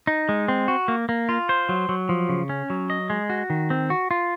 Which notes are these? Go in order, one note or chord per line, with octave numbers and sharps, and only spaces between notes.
D#4
G#3
C4
F#4
A#3
A#3
F4
C5
F#3
F#3
F3
C#3
C#4
F#3
D#5
G#3
F#4
D#3
C4
F#4
F4